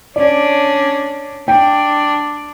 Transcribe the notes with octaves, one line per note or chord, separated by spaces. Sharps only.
C#4 D4 D5
D4 G5